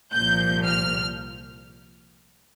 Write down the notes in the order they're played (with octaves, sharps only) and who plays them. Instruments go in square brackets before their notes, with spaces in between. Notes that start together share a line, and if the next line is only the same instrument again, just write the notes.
[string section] C2 A#2 F3 G6
F6